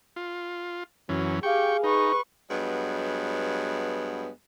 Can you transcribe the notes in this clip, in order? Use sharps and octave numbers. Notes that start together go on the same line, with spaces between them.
F4
F#2 E3 F#3 C#4
G4 G#4 F5 G5 C#6
D#4 B4 C#6
G2 F#3 G#3 B3